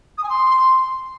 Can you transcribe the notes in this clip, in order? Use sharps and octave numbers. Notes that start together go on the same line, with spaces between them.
D#6
G#5
C6